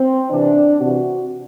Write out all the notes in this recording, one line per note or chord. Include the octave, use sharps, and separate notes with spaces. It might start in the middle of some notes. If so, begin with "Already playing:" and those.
Already playing: C4
C3 E3 D4
C3 E3 F#4